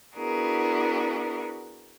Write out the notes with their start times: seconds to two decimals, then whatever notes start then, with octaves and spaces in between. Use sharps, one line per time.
0.16 B3 D4 E4 F#4 G#4 A#4